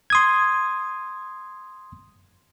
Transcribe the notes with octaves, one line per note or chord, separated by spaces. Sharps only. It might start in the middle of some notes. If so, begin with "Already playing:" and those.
C6 D#6 G#6